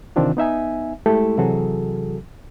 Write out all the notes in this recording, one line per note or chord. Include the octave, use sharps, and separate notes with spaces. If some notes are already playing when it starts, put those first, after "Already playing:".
C3 D#3 E3 C4 D4 F4
B3 D#4 E5 G#5
G#3 A3 E4 G4 A4
C3 E3 F#3 F#4 G#4 A4